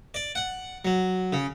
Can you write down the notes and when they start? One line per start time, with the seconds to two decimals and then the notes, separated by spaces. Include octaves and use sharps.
0.14 D5
0.35 F#5
0.85 F#3
1.33 C#3